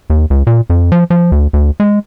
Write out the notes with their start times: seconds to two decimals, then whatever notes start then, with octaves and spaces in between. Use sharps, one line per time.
0.10 D#2
0.30 C#2
0.47 A#2
0.70 F2
0.92 F3
1.10 F3
1.32 D2
1.53 D2
1.80 G#3